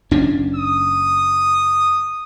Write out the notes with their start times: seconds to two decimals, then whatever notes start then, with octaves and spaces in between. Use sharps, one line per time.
0.11 F#1 C#4 D4
0.56 D#6